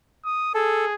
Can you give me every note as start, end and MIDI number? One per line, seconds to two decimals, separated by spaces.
0.25 0.49 87
0.54 0.95 68
0.54 0.85 69